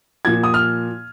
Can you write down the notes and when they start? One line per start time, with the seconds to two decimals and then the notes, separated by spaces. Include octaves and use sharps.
0.25 A#2 F3 G#6
0.43 D#6
0.54 F6